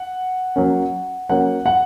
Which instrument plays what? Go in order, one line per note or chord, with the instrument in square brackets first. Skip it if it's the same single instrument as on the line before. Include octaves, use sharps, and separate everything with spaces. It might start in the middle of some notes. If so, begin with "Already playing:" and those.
Already playing: [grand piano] F#5
F#3 A#3 C#4
F#3 A#3 C#4 F#5
F#5